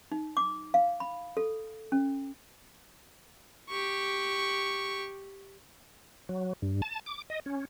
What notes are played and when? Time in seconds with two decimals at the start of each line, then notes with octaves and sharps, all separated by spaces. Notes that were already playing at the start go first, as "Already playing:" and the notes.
0.12 D#4
0.37 D6
0.74 F5
1.00 B5
1.37 A4
1.92 C#4
3.69 G4 C#6
6.29 F#3
6.62 G2
6.82 A5
7.06 D6
7.30 D#5
7.46 C#4